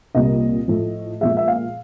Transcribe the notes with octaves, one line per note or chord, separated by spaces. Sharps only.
C2 A#2 G3 A#3 D#5
A2 F3 A3
A#2 F3 G#3 E5
E5
F5